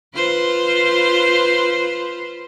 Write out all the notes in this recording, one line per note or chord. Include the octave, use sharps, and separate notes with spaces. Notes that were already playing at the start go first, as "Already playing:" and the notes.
F4 B4 C5